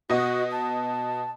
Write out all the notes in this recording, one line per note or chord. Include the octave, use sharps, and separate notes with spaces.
B2 F#4 D#5
A5